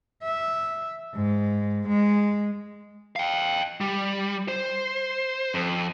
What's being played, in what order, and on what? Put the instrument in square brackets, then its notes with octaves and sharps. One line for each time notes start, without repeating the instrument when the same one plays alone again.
[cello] E5
G#2
G#3
[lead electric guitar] F5 G5
G3
C5
F2